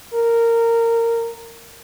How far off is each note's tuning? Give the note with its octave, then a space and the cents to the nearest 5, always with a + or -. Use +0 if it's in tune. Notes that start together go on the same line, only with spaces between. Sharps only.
A#4 -15